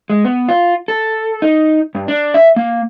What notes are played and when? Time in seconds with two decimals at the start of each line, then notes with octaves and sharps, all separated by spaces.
0.10 G#3
0.24 B3
0.49 F4
0.88 A4
1.42 D#4
1.95 G2
2.08 D4
2.34 E5
2.56 A#3